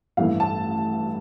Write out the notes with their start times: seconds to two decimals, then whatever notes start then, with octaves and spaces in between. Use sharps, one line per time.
0.17 A1 G2 E3 A3 F5
0.40 A5